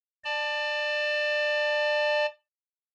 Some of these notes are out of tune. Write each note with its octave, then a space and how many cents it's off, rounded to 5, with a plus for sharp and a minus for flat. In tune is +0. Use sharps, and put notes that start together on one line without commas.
D5 +25 A5 +0